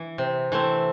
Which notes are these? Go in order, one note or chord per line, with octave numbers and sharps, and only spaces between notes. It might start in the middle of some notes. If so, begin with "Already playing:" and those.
Already playing: E3
C3
E3 A3 C4